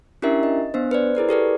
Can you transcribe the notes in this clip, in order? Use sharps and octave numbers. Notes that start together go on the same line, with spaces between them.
C#4 D4 E4 G4 A#4 E5
D#5
B3 D4 C5
B4 C5 D5
E4 G#4 A#4 B4
G4 A4 B4 D5